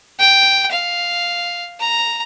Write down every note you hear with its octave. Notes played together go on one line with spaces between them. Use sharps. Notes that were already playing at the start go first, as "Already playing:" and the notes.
G5
F5
A#5